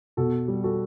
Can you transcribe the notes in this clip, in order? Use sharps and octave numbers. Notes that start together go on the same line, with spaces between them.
B2 F#4 A4
G3
F#4 A4